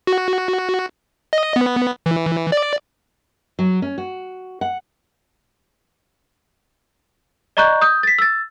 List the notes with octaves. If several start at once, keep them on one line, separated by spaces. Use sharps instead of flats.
F#4
D#5
B3
E3
D5
F#3
C#4
F#4
F#5
D5 D#5 A#5 C#6 F#6 G6
D#6 G6
A6 B6
E6 A6